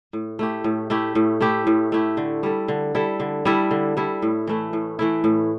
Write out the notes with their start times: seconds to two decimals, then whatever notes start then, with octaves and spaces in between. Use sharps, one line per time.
0.13 A2
0.39 A3 E4 G4
0.64 A2
0.90 A3 E4 G4
1.15 A2
1.41 A3 E4 G4
1.67 A2
1.92 A3 E4 G4
2.17 D3
2.43 G3 E4 A4
2.68 D3
2.95 G3 E4 A4
3.20 D3
3.45 G3 E4 A4
3.71 D3
3.97 G3 E4 A4
4.22 A2
4.47 E3 A3 E4
4.73 A2
4.99 E3 A3 E4
5.24 A2